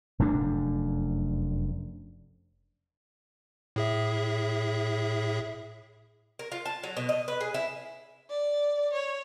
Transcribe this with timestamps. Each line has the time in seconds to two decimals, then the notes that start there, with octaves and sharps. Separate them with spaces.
0.19 F1 F#2 A3 D4
3.76 A2 G#4 E5
6.39 A#4
6.52 F4
6.66 A5
6.83 F#3
6.97 B2
7.09 D#5
7.28 B4
7.41 G#4
7.54 E4
8.30 D5
8.93 C#5